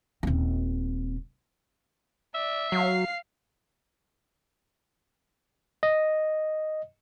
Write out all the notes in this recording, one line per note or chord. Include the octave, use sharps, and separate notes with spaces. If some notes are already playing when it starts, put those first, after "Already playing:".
D#1 C4
D5 E5
F#3 F5 C7
D#5